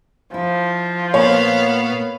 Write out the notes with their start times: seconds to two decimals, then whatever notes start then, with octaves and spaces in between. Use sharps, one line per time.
0.34 F3 E4
1.14 A#2 A#3 B3 C#5 F5 A5